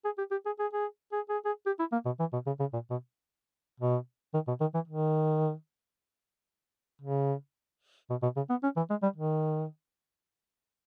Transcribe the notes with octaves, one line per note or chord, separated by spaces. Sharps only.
G#4
G4
G4
G#4
G#4
G#4
G#4
G#4
G#4
G4
E4
A#3
B2
E3
B2
C#3
C#3
A#2
B2
B2
D#3
B2
D#3
E3
D#3
C#3
B2
B2
C#3
B3
C#4
E3
G#3
G3
D#3